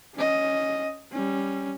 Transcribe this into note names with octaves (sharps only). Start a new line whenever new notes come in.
C#4 D#5
G3 C#4